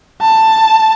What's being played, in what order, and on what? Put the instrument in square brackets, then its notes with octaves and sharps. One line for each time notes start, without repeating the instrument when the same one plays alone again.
[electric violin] A5